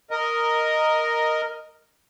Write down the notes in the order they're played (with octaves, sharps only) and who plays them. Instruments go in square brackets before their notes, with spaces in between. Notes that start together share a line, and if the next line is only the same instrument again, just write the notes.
[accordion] A#4 D#5